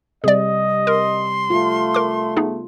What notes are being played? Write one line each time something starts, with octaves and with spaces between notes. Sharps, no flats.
C3 G3 G#4 D5 D#5
A#4 C6
A3 F4
A#4 D6
B3 D#4 G#4